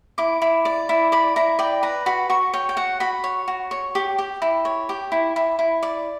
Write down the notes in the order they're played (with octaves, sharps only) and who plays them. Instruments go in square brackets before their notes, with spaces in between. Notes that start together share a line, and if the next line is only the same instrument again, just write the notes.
[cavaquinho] E4 D6
E4
D5
E4
D5 B5
E4 A#5
D5 G5
B4 A#5
F#4 B5
F#4 C#6
C#5 G5
G5
F#4 F#5
F#4 B5
C#5
F#4
C#5
G4
G4
E4
C#5
G4
E4
E4
E4
D5